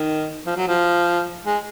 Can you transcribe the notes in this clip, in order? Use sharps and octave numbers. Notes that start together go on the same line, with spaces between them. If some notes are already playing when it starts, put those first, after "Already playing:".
Already playing: D#3
F3
F#3
F3
G#3